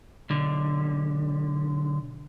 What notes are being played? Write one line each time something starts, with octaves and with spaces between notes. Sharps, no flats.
B1 D3